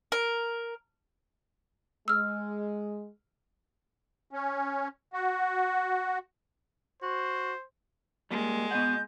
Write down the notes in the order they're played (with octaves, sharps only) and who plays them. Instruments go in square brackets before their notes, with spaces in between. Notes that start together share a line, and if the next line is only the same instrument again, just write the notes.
[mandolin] A#4
[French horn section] G#3 [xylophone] E6 F6
[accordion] C#4
F#4
[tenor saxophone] F#4 [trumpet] C5
[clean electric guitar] G3 A#3 [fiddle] G#3
[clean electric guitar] B3 D#5 F#5 [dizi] G6